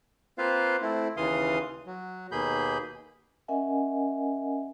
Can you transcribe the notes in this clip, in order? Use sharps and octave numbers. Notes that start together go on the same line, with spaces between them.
A#3 C4 F4 B4 C5 F5
A3 C4 E4
D#2 C#3 E3 F5 C6 D#6
F#3
D#2 B2 A#3 G#4 B5 G6
C#4 A#4 D#5 E5 F#5 G#5